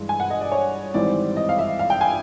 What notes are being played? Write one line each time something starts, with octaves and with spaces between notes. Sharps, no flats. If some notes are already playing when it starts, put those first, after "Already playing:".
Already playing: G2 E3 G#3
G#5
F#5
D#5
D5
C#5
G#1 G#2 E3 G3 C4 D5
D#5
F5
E5
F5
G5
G#5